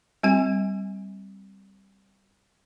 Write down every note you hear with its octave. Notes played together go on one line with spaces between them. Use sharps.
G3 C4 G#5